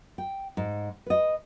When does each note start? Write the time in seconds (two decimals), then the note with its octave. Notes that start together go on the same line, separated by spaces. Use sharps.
0.18 G5
0.57 G#2
1.06 B4 D#5